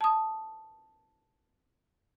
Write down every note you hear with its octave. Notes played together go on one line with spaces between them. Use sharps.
A5 D#6